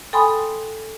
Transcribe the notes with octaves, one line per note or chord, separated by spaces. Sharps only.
A4 G5 G#5 B5 C6 D#6